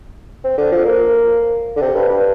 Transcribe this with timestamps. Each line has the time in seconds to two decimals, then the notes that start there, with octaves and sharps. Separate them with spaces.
0.44 C4
0.58 D3
0.72 F3
0.85 A#3
1.76 D3
1.81 C3
1.95 G2
2.09 G2